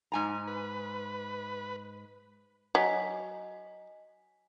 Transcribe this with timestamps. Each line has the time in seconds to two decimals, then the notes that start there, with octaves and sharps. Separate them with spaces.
0.12 G#2 G#5 A#5
0.47 B4
2.75 F#3 D#5 G#5 B6